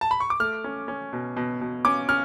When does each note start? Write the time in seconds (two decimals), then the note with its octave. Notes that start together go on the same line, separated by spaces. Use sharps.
0.01 A5
0.11 B5
0.20 C#6
0.30 D6
0.40 A3 F6
0.64 C#4
0.88 C#4
1.13 B2
1.36 B2
1.61 B2
1.85 C#4 D6
2.09 C#4 F6